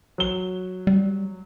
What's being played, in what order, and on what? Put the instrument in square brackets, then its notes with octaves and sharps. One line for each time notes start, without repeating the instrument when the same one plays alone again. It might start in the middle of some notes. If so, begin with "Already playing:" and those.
[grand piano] F#3 G7
[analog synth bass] G3